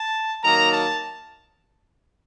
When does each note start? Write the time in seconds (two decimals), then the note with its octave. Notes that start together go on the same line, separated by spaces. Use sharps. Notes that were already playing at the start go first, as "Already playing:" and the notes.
Already playing: A5
0.43 D#3 F#3 A#3 A#5
0.72 A5